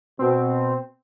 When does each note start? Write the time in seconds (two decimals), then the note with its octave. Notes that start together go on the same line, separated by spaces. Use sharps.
0.19 B2 C4